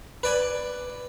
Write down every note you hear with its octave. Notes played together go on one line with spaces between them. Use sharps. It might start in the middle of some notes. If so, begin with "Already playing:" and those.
B4 D5 G#5